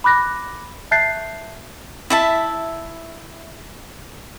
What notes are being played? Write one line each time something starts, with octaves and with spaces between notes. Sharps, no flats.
B5 D6 F#6 A#6
E5 A5 F#6 G6 A6 C7
E4 E5 A5